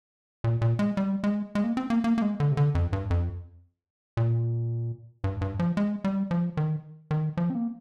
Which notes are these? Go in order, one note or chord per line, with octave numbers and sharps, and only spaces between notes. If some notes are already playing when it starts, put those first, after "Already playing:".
A#2
A#2
G#3
G3
G#3
G#3
A#3
C4
A#3
A#3
A#3
G#3
D3
C3
D3
F2
G2
F2
A#2
G2
G2
F3
G#3
G3
F3
D#3
D#3
F3
C4
A#3